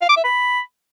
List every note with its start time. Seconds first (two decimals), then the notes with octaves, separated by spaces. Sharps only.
0.01 F5
0.09 D6
0.17 E5
0.24 B5